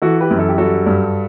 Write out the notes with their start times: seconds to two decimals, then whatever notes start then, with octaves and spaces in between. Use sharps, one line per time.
0.02 E3 F#4 A4
0.21 G4 B4
0.31 F#2
0.39 A4
0.49 G4
0.58 G3 F#4 A4
0.86 G2